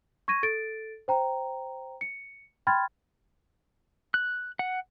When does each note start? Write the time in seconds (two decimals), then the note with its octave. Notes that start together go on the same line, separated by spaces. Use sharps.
0.28 C#6 G#6 A#6 D#7
0.43 A4 A6 D7
1.08 C5 G5 A#5
2.01 C#7
2.67 G5 B5 C6 F6 G#6 A6
4.14 F#6
4.59 F#5